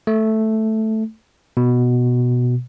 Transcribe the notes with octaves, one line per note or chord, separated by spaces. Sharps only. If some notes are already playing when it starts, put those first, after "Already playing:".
A3
B2